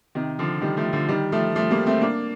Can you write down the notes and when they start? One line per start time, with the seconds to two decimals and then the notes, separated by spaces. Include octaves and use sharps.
0.15 C3 D#3
0.39 D3 F3
0.61 D#3 G3
0.77 F3 A3
0.93 D3 F3
1.08 D#3 G3
1.32 F3 A3
1.55 F3 A3
1.71 G3 A#3
1.86 A3 C4
2.01 A#3 D4